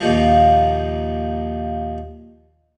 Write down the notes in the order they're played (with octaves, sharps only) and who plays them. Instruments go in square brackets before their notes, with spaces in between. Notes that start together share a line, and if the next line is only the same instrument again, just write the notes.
[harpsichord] D#2 A#2 D#3 F3